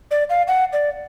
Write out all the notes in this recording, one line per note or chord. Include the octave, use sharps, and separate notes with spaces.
D5
F5
F#5
D5